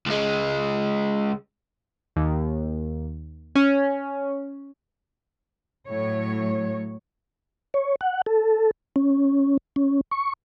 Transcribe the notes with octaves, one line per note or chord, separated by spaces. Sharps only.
C#2 G#3
D#2
C#4
A2 F#3 C#5
C#5
F#5
A4
C#4
C#4
C#6